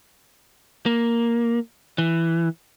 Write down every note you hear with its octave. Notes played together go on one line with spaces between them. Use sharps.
A#3
E3